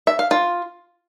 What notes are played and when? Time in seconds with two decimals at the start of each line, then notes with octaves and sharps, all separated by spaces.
0.07 E5
0.19 F5
0.31 F4